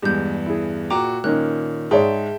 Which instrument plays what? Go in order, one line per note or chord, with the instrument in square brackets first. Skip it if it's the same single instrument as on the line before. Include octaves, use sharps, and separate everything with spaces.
[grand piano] E2 G2 [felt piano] G#3 [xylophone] G4 G6
[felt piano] E4 G#4
[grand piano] A#2 F#4 [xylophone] G5 A#5 D6
[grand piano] A#2 D#3 [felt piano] A#3 C#4 D#4 [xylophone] F#6
[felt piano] G#2 C#5 D5 [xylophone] G#4 [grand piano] E5 G5 A5